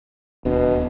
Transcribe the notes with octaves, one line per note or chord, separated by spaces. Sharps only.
D1 D#2 B2 D4